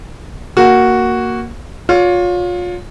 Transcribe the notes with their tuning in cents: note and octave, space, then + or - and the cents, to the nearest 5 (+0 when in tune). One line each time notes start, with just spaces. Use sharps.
A#3 +0 F#4 +0
F4 +30 C#5 +30